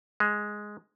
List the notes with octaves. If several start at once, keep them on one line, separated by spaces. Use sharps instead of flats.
G#3